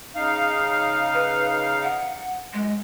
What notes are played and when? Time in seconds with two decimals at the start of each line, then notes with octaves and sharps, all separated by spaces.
0.15 C#3 D#4 F5
1.14 B4
1.83 F#5
2.53 F#2 G#3